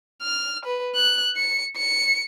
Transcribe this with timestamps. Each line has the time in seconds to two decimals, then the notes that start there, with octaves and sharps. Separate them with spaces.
0.22 F6
0.65 B4
0.95 F#6
1.37 C#7
1.77 C#7